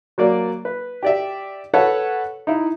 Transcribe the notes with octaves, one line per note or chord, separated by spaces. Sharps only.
F#3 A#3 D5
B4
G4 D5 E5
A4 B4 C#5 F#5 A5
D#4 E4